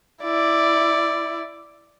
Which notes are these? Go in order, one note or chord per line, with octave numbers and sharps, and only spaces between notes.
E4 D5